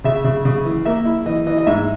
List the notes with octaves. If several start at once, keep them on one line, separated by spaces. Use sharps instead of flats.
C#3 E5
C#3
C#3
E3
A#3 E5
E4
E3 D#5
E3 D#5
D#5
G#2 E5